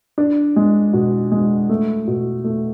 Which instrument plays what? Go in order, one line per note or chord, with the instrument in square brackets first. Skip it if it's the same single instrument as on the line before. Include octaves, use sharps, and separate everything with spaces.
[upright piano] D4
G#3
B2
G#3
A3
B2
A3